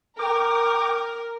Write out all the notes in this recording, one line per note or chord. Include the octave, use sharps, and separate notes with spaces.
A#4 G5 D6